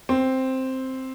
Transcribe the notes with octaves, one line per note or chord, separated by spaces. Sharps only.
C4